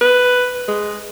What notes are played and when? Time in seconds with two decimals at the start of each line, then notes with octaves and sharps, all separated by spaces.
0.01 B4
0.68 G#3